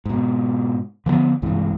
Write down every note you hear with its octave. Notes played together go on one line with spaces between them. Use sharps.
G#2 B2
D3 F3 G3 B3
C2 G2 E3 G#3